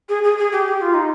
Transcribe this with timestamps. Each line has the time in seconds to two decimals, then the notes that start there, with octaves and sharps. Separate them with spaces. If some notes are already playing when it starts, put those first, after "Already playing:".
0.09 G#4
0.24 G#4
0.38 G#4
0.52 G4
0.67 G4
0.81 F4
0.94 D#4